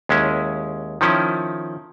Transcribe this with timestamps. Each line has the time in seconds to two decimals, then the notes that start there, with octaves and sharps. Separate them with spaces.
0.09 D#2 G#3 C#4 E4
1.01 D#3 F3 C#4 E4